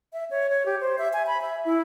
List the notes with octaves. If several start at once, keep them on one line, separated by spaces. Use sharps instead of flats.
E5
C#5
C#5
G4
C5
E5
G#5
B5
E5
E4